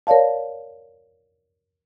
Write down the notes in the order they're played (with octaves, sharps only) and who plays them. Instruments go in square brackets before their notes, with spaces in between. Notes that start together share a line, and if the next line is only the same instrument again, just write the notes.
[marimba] A#4 C#5 D5 F5 A5